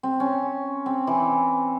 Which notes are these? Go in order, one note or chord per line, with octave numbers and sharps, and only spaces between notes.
C4
C#4
C4
E3